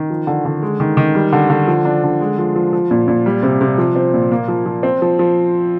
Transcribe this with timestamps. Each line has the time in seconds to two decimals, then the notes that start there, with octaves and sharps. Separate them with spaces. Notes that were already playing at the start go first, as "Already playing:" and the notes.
Already playing: D#3
0.10 F3
0.27 D3
0.45 D3
0.62 G#3
0.80 D#3
0.97 D#3
1.15 G3
1.33 D3
1.50 D3
1.67 F3
1.85 D4
2.04 D3
2.21 G#3
2.38 F3
2.56 F3
2.73 F3
2.91 A#2
3.08 A#2
3.26 G3
3.43 C3
3.61 C3
3.78 F3
3.96 C4
4.14 A#2
4.31 A#3
4.48 F3
4.66 F3
4.83 C4
5.02 F3
5.19 F3